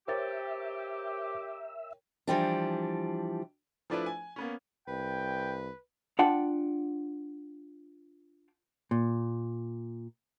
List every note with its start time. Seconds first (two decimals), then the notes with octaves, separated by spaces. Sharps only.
0.08 G4 A#4 C5 C#5 E5 G5 A6
2.27 E3 F3 G3 D4
3.90 F3 A3 D4 E4 B4 D5
4.06 G#5
4.36 A#3 B3 C#4
4.88 C2 B4 G5
6.19 D4 F4 F#5 G5 A5
8.91 A#2